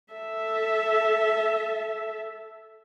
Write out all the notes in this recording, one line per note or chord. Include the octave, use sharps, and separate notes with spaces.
A4 E5